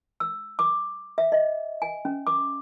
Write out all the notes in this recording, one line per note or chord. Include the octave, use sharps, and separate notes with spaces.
E6
D6
E5
D#5
G#5
C#4
D6